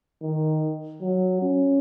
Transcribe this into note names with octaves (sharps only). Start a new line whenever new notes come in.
D#3
F#3
C#4